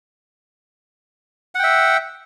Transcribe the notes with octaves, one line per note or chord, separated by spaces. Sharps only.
E5 F#5 G5